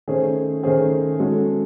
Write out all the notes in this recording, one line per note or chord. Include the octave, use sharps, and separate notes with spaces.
D#3 A3 C#4 G#4 C5
D#3 A3 C#4 G#4 C5
G#3 C#4 F#4 A4